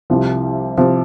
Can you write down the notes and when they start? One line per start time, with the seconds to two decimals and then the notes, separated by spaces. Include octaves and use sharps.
0.10 C2 C3 F3
0.77 C3 F3